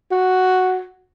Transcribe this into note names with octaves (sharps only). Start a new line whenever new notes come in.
F#4